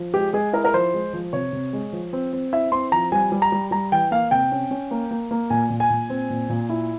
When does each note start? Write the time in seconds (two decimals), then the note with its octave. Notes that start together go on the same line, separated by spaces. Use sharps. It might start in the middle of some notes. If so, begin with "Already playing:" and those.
Already playing: F3
0.14 G#3 G4
0.33 G#3 G#4
0.53 E4 A#4
0.65 A#4
0.74 F3 C5
0.94 G#3
1.13 F3
1.33 C3 C#5
1.53 C3
1.73 G#3
1.93 F3
2.13 C4
2.33 C4
2.53 E4 E5
2.72 C4 C6
2.92 F3 A#5
3.12 G3 G#5
3.32 G3
3.42 A#5
3.52 G3
3.71 G3 A#5
3.92 E3 G5
4.11 A#3 F5
4.31 C3 G5
4.52 C#4
4.71 C#4
4.91 A#3
5.11 A#3
5.31 A#3
5.50 A#2 G#5
5.70 A#2
5.80 G#5
5.90 A#2
6.10 C4
6.30 A#2
6.49 A#2
6.70 E4